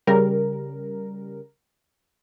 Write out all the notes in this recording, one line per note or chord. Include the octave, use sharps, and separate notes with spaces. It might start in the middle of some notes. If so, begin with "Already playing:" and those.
C#3 G3 A#4